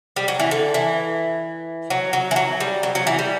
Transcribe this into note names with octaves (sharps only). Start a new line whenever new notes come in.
G3
F#3
E3
D3
E3
F#3
F#3
E3
F#3
G3
F#3
F#3
E3
G3